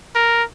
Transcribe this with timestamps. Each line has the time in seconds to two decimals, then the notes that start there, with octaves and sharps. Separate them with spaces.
0.15 A#4